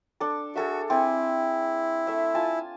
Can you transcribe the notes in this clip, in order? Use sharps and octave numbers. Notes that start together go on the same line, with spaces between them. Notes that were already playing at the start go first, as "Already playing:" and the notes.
D4 A4
F#4 G#4 A4 E5
C4 E4 G#5
A3 E5
F4 G#5 A5